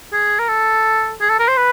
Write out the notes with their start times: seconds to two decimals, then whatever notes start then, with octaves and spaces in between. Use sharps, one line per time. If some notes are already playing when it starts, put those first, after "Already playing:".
0.12 G#4
0.39 A#4
0.48 A4
1.21 G#4
1.29 A4
1.39 A#4
1.48 C5
1.57 B4